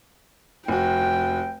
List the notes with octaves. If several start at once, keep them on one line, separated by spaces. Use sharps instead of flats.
F1 F#4 G5